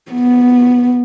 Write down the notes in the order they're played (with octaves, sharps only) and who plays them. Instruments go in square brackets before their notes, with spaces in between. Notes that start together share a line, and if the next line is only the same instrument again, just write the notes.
[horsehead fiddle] B3